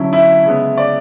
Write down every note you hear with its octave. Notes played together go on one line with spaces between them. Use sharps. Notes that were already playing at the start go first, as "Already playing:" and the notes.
Already playing: D3 F#3 C#4 E4
E4 E5
C#3 G#3 B3 E4
D5